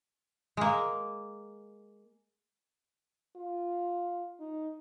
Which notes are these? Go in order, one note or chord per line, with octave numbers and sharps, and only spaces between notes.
G#3 A#3
F4
D#4